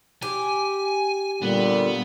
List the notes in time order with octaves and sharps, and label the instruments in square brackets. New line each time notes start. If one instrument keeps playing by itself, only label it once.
[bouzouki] G4 [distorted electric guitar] G#5
[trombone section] A#2 D3 G3 [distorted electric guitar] B3